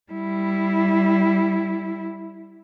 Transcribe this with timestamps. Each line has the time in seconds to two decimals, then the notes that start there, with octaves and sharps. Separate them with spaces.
0.12 G3 E4